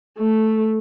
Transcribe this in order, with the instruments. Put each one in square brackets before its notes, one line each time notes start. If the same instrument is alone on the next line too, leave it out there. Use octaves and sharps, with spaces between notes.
[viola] A3